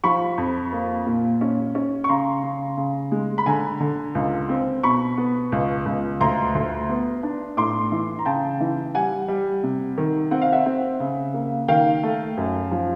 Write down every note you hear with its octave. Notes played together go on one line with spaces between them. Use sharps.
F3 B5 C#6
F2
A#3
A#2
C#4
C#4
C#6
C#3 A#5 C6
C#3
C#3
G#3
B5
D3 G#5 A#5
D3
C#2
C4
B2 B5 C#6
B3
C#2
C#2
D2 A#5 C6
D2
B3
D4
A2 C6 D6
E3
A#5
C#3 G5 A5
E3
G3 F#5 G#5
G3
C3
D#3
C4 F#5
F5
E5 F#5
C4
C#3
A#3
D#3 F5 G5
A3
F#2
F3